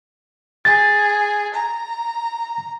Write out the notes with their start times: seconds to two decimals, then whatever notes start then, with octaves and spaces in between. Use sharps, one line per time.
0.65 G#4 A6
1.54 A#5